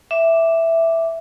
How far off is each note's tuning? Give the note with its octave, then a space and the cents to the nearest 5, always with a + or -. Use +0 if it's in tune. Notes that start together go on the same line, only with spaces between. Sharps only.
E5 +0 D6 +0